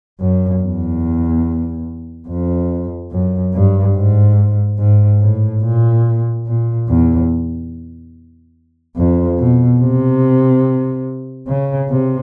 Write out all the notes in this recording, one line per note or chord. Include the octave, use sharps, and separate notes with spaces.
F#2
E2
F2
F#2
G2
G#2
G#2
A2
A#2
A#2
E2
F2
B2
C3
C#3
C3